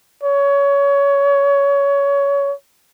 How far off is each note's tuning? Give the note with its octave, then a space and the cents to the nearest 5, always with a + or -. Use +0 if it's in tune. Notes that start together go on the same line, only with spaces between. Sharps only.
C#5 +20